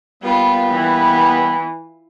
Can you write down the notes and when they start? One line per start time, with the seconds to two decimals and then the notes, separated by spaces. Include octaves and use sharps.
0.23 G3 A#3 B3 F4
0.70 E3